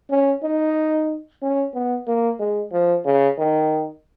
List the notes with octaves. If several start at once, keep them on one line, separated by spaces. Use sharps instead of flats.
C#4
D#4
C#4
B3
A#3
G#3
F3
C#3
D#3